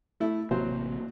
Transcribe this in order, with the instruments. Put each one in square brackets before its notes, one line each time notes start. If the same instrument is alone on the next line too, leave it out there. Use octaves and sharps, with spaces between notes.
[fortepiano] A3 E4
[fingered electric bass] A1 C3 A#3 [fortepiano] F#3 C5